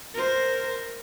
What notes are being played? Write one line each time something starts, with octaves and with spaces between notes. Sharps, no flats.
A#4 C5